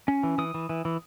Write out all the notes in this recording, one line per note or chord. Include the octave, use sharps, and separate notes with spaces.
C#4
E3
E3 D#6
E3
E3
E3